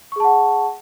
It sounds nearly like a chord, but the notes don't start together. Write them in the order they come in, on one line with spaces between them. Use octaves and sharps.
C#6 G#4 A5 F#5